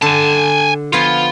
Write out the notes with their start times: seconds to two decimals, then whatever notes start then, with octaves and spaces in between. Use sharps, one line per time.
0.02 D3 G#5 A5
0.93 F3 B3 F4 G#5